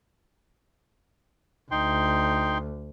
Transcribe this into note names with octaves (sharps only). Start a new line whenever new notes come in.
D2 D#4 G5 C6